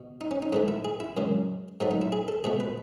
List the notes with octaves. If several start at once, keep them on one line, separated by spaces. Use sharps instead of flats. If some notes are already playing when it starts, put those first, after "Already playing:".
Already playing: B2
D#4
C#4
D#4
G#2 E3 A3 D#4
E4
G#4
E4
F#2 C#3 E3 G#3
G#2 F#3 A3 D#4
D#4
E4
G#4
A4
C#2 B2 A3 G#4
B4